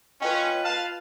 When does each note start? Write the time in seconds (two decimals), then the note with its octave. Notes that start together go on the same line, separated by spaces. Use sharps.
0.22 C#4 F4 B4 D#5 G5
0.65 F5 A5 F6